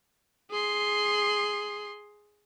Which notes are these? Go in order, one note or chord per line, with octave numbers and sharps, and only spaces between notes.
G#4 C6